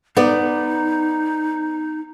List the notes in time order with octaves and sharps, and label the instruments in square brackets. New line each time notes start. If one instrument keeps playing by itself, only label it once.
[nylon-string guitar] B3 D5 [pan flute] D#4